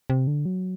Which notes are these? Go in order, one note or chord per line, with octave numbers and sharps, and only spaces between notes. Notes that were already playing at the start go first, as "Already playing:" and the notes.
C3
D3
F#3